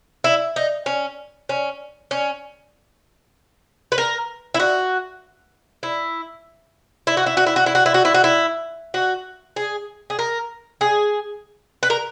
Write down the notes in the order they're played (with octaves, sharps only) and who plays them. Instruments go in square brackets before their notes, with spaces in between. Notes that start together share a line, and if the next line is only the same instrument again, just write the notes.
[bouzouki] E4
D#4
C#4
C#4
C#4
B4
A#4
E4
F#4
E4
E4
F#4
E4
F#4
E4
F#4
E4
F#4
E4
F#4
E4
F#4
E4
F#4
G#4
G#4
A#4
G#4
B4
A#4